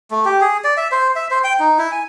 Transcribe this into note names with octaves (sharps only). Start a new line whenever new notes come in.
A3
G4
G#4
D5
E5
C5
E5
C5
G5
D#4
E4
G#5